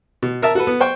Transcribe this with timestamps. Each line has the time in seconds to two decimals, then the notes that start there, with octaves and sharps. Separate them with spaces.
0.23 B2
0.42 A#4 E5 A5
0.55 F#4 A4 B4
0.67 B3
0.80 C5 G5 C#6